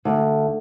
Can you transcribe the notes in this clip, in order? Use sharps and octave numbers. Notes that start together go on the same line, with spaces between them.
D2